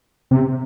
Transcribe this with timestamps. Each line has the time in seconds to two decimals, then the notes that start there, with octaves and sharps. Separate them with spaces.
0.31 C3